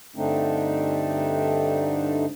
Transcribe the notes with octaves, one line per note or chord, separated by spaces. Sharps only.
G2 D3 A3 C4 D4 D#4